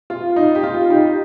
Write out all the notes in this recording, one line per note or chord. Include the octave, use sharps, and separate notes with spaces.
F4
D#4
G4
F4
D#4 G4